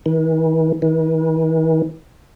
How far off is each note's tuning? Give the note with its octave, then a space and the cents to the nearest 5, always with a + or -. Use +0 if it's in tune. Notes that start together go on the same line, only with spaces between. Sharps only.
E3 -45
E3 -45